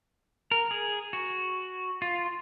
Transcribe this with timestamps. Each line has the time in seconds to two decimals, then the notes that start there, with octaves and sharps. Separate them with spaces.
0.51 A#4
0.71 G#4
1.13 F#4
2.02 F4